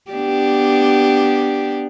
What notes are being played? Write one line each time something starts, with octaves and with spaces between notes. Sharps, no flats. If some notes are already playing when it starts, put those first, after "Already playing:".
B3 D4 G4